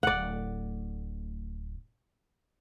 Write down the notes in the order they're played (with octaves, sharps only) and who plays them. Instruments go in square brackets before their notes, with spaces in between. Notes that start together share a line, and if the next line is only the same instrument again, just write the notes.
[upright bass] D1 A2 [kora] D5 F#5